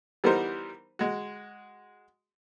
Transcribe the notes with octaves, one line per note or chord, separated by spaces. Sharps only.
E3 G3 B3 D#4 A#4 C5
G#3 F#4